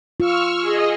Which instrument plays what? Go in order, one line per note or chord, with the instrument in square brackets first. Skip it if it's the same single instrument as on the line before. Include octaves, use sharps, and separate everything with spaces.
[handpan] F4 [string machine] C#6 E6 F6
[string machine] G#4 D#5